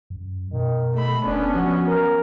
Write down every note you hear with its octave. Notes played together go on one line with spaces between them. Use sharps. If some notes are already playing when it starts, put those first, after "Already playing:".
F#2
B2 D#3
A3 B5
F1 B3 C#4 D4
F3 F#4
A#4